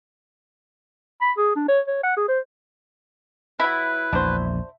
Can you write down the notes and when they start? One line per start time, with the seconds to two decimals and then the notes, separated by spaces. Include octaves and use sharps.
1.22 B5
1.37 G#4
1.56 D4
1.68 C#5
1.88 C#5
2.03 F#5
2.17 G#4
2.28 C5
3.60 F#3 E4 B4 B5
4.13 A#1 E2 D4 F#4 C5